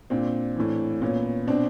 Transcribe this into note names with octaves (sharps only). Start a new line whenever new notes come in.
A#2 C4 D4
A2 E3
A#2 B3 C#4
B2 C4 D4